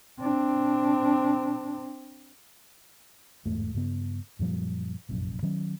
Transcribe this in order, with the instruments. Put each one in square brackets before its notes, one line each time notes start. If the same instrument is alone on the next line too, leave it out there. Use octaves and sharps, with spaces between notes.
[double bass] C4 D4
[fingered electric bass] G1 E2 G#2 A3
G2 C#3 B3
F#2 A#2 F3 G3
F1 A#1 F#2
D#3 F#3 C#4